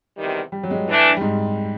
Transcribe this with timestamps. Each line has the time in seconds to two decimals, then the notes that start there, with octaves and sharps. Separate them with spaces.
0.17 E2 C3 D#3 G3
0.52 G3
0.63 F#3
0.70 G#3
0.74 G3
0.87 E3 A3 D4
1.17 G3
1.21 G#2 G#3